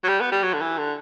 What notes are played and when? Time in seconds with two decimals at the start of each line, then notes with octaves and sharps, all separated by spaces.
0.04 F#3
0.08 G3
0.20 B3
0.32 G3
0.43 F#3
0.53 D3
0.61 E3
0.78 D3